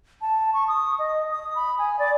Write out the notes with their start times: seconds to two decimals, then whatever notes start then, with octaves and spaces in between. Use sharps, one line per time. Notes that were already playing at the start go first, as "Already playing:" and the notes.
0.21 A5
0.54 C#6
0.68 D#6
0.99 D#5
1.31 D#6
1.55 B5
1.79 G#5
1.99 D5